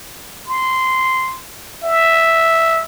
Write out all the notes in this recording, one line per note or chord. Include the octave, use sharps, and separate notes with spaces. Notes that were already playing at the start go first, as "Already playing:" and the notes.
C6
E5